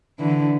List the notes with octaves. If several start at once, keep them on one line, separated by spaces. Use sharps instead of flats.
D3 E3